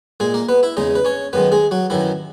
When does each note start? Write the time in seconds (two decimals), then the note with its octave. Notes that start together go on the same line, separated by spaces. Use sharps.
0.20 A#2 G#3 G#4
0.34 A#3 A#4
0.49 B3 B4
0.63 E4 E5
0.77 E2 C#3 G#3 D#4 D#5
0.95 B4
1.05 C#4 C#5
1.33 F#2 D#3 G#3 B3 B4
1.52 G#3 G#4
1.71 F#3 F#4
1.90 F#2 D#3 E3 F#3 E4